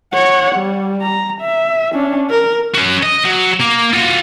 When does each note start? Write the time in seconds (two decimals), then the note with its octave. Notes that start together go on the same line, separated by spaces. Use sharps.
0.13 C#5 F#5
0.56 G3
1.02 A#5
1.42 E5
1.93 C#4 D4
2.30 A#4
2.75 C#4 F#4
3.03 D#5
3.25 F#3
3.61 A#3
3.93 F4 F#4